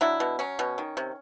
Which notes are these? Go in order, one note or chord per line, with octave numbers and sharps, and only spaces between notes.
F#3 D4 E4
B2
F#3 C#4
B2
D#3
C3